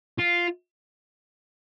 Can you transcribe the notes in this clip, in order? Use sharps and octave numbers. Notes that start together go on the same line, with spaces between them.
F4